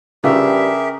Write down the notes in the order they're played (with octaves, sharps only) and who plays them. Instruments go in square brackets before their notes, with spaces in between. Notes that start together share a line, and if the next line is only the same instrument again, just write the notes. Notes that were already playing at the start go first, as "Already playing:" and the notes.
[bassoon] G2 [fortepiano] C#3 F4 [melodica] G4 G#4 A#4 [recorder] E5